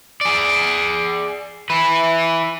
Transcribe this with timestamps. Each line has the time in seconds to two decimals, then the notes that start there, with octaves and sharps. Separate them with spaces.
0.21 G#4 D5
1.70 E4 B4